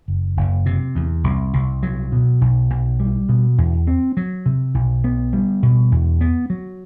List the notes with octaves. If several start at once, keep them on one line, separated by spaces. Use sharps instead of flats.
F#1
F#1
C3
E2
C2
C2
F#3
B2
B1
B1
G3
B2
E2
C4
F#3
C3
B1
B3
G3
B2
E2
B3
F#3